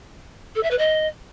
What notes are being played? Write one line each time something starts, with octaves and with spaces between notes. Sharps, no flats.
A4
E5
B4
D#5